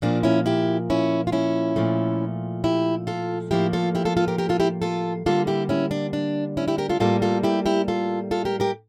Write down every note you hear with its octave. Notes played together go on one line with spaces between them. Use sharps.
A#2 F3 A#3 D4
C#4 E4
E4 G4
C#4 E4
F4
C#4 E4
A#2 F3 A3
E4 G4
F4 A4
A2 F3 A#3 E4 G4
F4 A4
E4 G4
F4 A4
F4 A4
G4 A#4
G4 A#4
F4 A4
E4 G4
F4 A4
D3 G3 A#3 F4 A4
E4 G4
C#4 E4
D4
D4
C#4 E4
E4 G4
G4 A#4
F4 A4
A2 G3 A#3 F4 A4
F4 A4
E4 G4
E4 G4
F4 A4
F4 A4
G4 A#4
G4 A#4